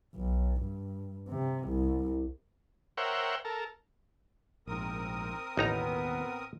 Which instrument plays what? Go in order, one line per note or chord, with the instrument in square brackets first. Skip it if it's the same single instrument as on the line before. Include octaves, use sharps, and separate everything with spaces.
[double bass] B1
G2
C3
C2
[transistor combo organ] A#4 C5 C#5 E5 F#5 G5
A4 A#4
[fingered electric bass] A#1 G#2 [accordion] C4 A#4 D#6
[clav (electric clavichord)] A1 D#4 A#5 [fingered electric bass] D#2 B2 [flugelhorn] B3